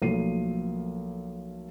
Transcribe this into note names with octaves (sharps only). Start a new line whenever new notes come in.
B1 F3 A3 A#3 C7 D#7